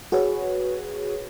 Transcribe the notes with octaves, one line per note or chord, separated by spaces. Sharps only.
F#4 G#4 B4 C#5